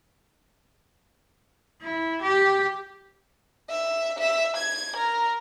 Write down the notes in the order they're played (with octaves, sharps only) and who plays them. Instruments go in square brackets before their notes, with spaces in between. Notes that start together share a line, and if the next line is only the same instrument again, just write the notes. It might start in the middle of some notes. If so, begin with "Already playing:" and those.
[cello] E4
G4
[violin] E5
E5
G#6
A#4